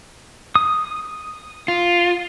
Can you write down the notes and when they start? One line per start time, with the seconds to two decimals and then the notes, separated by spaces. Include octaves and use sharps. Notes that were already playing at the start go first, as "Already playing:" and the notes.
0.55 D#6
1.68 F4